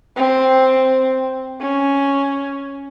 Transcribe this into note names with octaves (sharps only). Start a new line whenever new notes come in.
C4
C#4